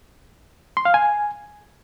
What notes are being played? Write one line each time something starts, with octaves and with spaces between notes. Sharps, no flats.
C6
F5
G#5